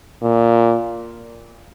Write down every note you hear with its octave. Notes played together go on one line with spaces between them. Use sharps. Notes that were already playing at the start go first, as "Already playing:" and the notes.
A#2